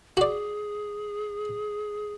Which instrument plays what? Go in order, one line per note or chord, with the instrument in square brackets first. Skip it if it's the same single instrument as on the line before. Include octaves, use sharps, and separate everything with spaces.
[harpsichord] F#4 D5 [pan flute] G#4